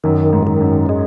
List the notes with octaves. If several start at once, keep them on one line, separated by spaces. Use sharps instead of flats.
F#2 D#3
G#2
D#3
F#2
G#3